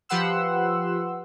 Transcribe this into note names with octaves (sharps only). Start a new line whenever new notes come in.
F3 G4 B4 F#5 C6 E6